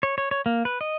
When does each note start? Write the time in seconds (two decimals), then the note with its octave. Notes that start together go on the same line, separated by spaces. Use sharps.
0.03 C#5
0.18 C#5
0.31 C#5
0.46 A#3
0.65 B4
0.81 D#5